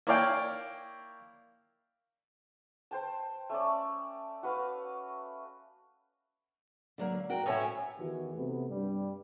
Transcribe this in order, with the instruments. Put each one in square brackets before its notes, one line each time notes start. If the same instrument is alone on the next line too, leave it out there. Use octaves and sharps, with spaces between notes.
[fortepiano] A#3 E4 C#5 D5 F5 G5
[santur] C5 G5 A5
A3 C#4 D5
F#4 B4 F5
[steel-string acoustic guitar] D3 F#3 A#3
F#4 A#4 G5
[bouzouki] A2 C#4 G#5 [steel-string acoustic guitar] C#5 E5
[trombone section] E2 D#3 E3 F#4 G4
C3 A3 B3
G2 G3